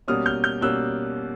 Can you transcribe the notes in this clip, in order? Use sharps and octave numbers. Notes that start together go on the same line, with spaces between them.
B2 G3 A#3 C#4 D#6 F6
F6 G6
F6 G6
B2 G3 A#3 C#4 E6 F#6